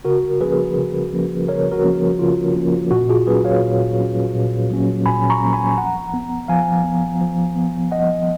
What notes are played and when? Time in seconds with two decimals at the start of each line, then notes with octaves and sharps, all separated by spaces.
0.05 C#3 F#4 A#4
0.41 F3 A#3 C#4 G#4 B4
0.77 C#3
1.13 F3 A#3 C#4
1.48 C#3 A#4 C#5
1.72 F#4 A#4
1.84 F3 A#3 C#4
2.19 C#3 F4
2.55 F3 A#3 C#4
2.91 A#2 F#4
3.10 F4 G#4
3.27 F#3 A#3 C#4 G#4 B4
3.45 C#5 F5
3.62 A#2
3.98 F#3 A#3 C#4
4.35 A#2
4.71 F#3 A#3 C#4
5.06 A#2 G#5 B5
5.30 A#5 C#6
5.42 F#3 A#3 C#4
5.53 G#5 B5
5.77 F3 F#5 A#5
6.14 B3
6.48 F3 F5 G#5
6.84 B3
7.21 F3
7.56 B3
7.91 F3 D#5 F#5